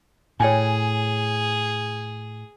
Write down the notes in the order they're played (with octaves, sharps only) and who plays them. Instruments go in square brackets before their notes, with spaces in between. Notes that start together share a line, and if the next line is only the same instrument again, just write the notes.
[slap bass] A2 [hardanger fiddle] G#4 [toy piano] C#5 G5 G#5